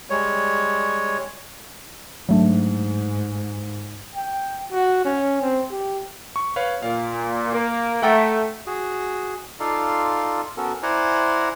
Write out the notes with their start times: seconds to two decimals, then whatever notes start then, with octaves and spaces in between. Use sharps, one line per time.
0.10 G3 G#3 C#5
2.29 G#2 F#3 A3 D4
4.15 G5
4.72 F#4
5.05 C#4
5.41 C4
5.71 G4
6.36 C#6
6.56 B4 C#5 F5
6.82 A#2 F5
7.53 A#3
8.03 A3 F#5 G5 A#5
8.67 F#4 G#4
9.60 D#4 F4 A4 D5 F5 C6
10.57 B3 C#4 F#4 A4 A#4
10.83 E4 C5 D5 F#5 G#5 A#5